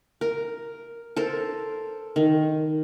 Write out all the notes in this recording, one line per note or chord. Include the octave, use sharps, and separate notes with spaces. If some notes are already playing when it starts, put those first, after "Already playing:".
A#4
A4 A#4 C5
D#3